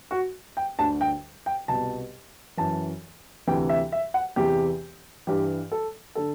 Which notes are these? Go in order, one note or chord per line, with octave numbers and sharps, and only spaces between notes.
F#4
G5
D2 D3 A5
G5
G5
C2 B2 A5
F#2 E3 A5
D2 C3 E3 G5
E5
E5
F#5
E2 C3 E3 G4
G2 E3 G4
A4
D3 A4